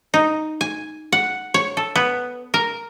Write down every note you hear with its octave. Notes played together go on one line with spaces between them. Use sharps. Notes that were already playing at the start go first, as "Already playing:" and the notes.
D#4
G#5
F#5
C#5
A4
B3
A#4